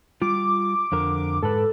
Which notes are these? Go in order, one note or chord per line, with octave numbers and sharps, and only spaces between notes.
G3 F4 D6
F2 D3 A#4
G#2 A4 B4